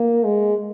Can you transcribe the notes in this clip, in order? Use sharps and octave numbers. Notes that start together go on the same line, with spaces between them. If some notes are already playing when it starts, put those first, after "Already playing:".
Already playing: A#3
G#3